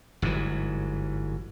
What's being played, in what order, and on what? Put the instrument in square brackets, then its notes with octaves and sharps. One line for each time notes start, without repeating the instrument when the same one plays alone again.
[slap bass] G1 G#2 E3 F#3